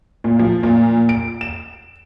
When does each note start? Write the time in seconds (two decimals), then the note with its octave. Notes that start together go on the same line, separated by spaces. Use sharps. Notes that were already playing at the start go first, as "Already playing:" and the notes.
0.24 A#2
0.39 F3
0.63 A#2
1.09 D7
1.41 E7